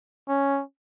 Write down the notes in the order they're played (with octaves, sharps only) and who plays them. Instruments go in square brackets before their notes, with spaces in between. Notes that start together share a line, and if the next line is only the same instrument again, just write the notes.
[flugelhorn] C#4